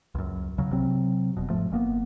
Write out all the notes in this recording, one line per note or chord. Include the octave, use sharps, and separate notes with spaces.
C#2 F#2
C2 C#3 F#3
C3 F#3 C4
F1 B2
G#2 F3 A3
F#1 A#3 B3